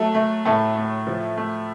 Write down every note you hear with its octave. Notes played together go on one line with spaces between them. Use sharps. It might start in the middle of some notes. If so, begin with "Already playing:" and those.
Already playing: F#3 A3 A4
A3
A2 A3 A4
A2
F3
A3